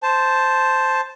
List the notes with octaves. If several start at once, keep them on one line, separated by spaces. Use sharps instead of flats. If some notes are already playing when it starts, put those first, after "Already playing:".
C5 A5